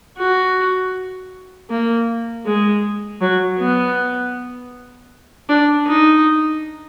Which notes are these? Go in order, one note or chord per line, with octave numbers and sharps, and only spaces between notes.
F#4
A#3
G#3
F#3
B3
D4
D#4